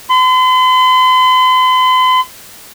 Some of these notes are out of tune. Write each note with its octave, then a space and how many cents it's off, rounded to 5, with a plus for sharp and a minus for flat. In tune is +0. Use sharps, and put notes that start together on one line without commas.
C6 -45